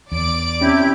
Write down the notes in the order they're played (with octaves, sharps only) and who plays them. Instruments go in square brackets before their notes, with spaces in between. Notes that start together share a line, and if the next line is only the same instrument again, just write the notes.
[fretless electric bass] E2 [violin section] D5 D7
[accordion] C3 E4 G4 [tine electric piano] C#4